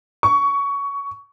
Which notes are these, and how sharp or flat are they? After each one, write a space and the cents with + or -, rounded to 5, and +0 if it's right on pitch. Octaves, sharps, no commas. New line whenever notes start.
C#6 +20